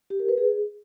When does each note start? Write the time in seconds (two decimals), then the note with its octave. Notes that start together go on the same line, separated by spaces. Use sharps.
0.10 G4
0.19 A#4
0.29 B4
0.38 G#4